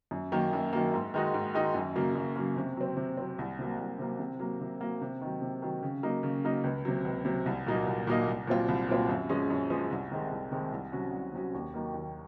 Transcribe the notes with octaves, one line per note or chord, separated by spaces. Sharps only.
F#2
D#3 F#3 A#3
F#2
D#3 F#3 A#3
G#2
D#3 G#3 D#4 F#4
G#2
D#3 G#3 D#4 F#4
F#2
C#3 F#3 A#3
F#2
C#3 F#3 A#3
C3
F#3 C4
C3
F#3 C4
C2
C3 F#3 A#3
C2
C3 F#3 A#3
C3
F#3 A#3
C3
F#3 A#3
C3
D#3 F#3
C3
D#3 F#3
C#3
F#3 A#3 D#4
C#3
F#3 A#3 D#4
C#2
C3 F#3
C#2
C3 F#3
C2
A#2 F#3 A#3 D#4
C2
A#2 F#3 A#3 D#4
C2
A#2 F#3 C4 F4
C2
A#2 F#3 C4 F4
F#2
F3 G#3 C#4
F#2
F3 G#3 C#4
C2
C3 D#3 G#3
C2
C3 D#3 G#3
C2
C3 F#3 C#4 F#4
C2
C3 F#3 C#4 F#4
D#2
D#3 F#3 A#3
D#2